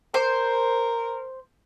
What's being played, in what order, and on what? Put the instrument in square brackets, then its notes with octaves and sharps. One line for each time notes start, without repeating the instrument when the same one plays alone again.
[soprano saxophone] A#4 [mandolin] C5